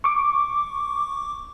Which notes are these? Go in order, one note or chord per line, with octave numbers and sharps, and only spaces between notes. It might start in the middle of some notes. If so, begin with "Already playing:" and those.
C#6 D6